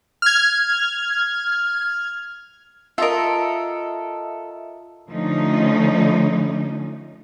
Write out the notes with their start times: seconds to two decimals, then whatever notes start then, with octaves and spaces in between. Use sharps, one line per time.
0.22 F6 G#6
2.98 F4 A4 A#4 D#5 E5
5.09 D3 F3 A3 C#4 D#4